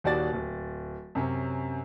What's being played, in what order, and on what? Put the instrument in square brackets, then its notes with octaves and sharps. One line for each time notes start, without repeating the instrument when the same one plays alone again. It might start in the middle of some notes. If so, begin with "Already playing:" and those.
[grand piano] D#1 D#2 F#4 G4 D5 A6
D1
F#2 C3 C#4